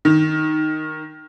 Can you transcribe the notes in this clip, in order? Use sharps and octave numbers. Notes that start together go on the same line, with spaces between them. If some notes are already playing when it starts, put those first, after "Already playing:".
D#3